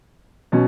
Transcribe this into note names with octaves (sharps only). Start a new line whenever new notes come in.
B2 F#3 C#4